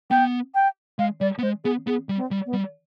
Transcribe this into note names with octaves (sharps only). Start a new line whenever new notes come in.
B3 G5
G5
G#3 F5
G3 D5
B3
G#3 C5
B3 G#4
B3 G#4
G3
C4
G3
B3
G3